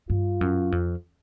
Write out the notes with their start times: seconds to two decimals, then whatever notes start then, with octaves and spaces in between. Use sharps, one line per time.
0.10 G2 F4
0.41 F#2
0.72 F2